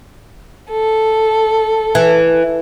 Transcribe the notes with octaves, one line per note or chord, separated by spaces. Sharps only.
A4
E3